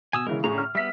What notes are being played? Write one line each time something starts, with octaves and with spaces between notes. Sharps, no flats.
B2 G#5 D#6 E6
C#3 E3 G#3 A#4
A2 D3 C#4 G#4 A#5
F6
G3 B3 E5 B6